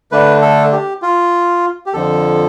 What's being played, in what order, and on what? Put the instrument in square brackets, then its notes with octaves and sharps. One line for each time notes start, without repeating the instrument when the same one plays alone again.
[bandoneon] D3 A3 D4 B4
A4
G4
F4
G4
F2 D3 F3 A4